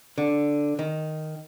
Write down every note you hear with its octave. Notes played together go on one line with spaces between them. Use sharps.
D3
D#3